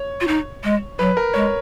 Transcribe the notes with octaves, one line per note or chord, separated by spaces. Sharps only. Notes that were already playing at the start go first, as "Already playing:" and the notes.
Already playing: C#5
F4
D#4
G#3
F#3 B4
A#4
G#3 C#5